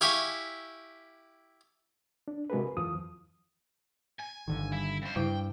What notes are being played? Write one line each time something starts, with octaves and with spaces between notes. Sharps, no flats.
E4 G4 E5 F5 G#5 C#6
D4
C3 G#3 F#4 G#4 A#4 B4
F2 E3 F3 D#6
G#5
G1 D3 D#3
G3 E4
F2 C5
G2 C#3 G3 E4 G5